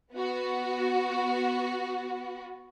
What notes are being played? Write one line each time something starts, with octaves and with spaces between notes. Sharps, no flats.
B3 F#4